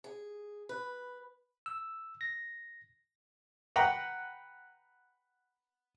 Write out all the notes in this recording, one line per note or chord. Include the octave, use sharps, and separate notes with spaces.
G#4
B4
E6
A#6
B4 F#5 G5 A#5 B5